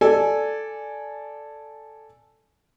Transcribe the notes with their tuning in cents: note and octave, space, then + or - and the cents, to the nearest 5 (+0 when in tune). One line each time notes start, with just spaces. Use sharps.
A4 +0 D5 +0 G#5 +0